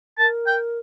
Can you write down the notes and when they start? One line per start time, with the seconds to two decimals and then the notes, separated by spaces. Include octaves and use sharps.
0.18 A#4 A5
0.46 G5